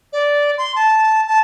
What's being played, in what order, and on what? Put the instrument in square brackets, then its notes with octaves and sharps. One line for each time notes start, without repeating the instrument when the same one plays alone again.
[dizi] D5
C6
A5
A5